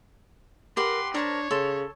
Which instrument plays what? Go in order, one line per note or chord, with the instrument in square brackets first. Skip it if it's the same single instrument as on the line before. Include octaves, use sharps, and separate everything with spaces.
[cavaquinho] G4 B4 F#5 [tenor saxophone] A#4 [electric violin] C6
[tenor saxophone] D4 [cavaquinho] A#4 C5 A5 [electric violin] C#5
[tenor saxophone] C#3 [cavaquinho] A4 C6